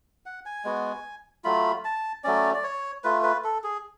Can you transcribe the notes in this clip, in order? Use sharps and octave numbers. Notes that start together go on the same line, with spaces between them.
F#5
G#5
G#3 B3 F#4
F#3 A3 F4 B5
A5
F#3 A3 C#4 D5
D5
C#5
A3 F4 B4
B4
A4
G#4